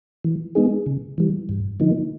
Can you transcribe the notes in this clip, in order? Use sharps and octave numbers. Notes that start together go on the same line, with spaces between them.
E3
G#3 B3 D#4 G#4
C#3
E3 G3
G2
D3 F3 A#3 D#4